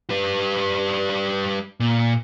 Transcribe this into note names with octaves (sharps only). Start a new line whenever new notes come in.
G3 B4
A#2